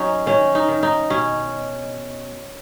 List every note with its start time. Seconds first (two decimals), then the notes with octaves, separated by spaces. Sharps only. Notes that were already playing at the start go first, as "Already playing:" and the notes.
Already playing: F#3 C#4 D#4
0.26 D#3 C#4
0.55 D#4
0.68 D#3
0.83 D#4
1.10 B2 C#4